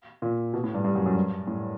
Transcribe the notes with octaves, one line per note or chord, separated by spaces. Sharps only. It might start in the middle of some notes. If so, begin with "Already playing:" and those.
A#2
B2
A2
G2
G2
F#2
F#2
G2
A2